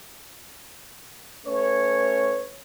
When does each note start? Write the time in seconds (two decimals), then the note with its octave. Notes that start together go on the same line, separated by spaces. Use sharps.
1.47 A3 C#4 B4 C#5